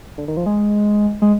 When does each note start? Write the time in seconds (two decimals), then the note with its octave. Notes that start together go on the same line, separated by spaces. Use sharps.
0.18 D3
0.28 D#3
0.37 F3
0.46 G#3
1.22 G#3